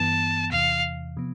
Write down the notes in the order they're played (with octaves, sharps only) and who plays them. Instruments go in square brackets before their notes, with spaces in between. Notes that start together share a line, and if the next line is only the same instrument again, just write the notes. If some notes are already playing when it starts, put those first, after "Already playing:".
Already playing: [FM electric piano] G2 E3 B3 [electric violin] A5
[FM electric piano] E2 C3 E3 [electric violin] F5
[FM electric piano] C3 F3 B3